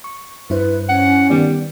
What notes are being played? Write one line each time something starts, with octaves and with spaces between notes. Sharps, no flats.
C#6
G2 E4 B4 C5
C#4 F#5
D#3 G3 B3 D5